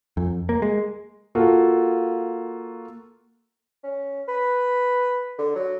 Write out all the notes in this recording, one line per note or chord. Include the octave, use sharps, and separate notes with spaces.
F2
A#3
G#3
A#3 F4 F#4 A4
C#4
B4
D3
F#3